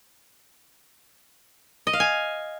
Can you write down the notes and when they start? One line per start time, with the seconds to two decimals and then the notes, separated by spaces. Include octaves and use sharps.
1.87 D#5
1.93 F5
2.00 G#5